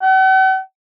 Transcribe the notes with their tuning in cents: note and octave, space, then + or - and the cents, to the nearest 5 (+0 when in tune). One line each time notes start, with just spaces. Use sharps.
F#5 +45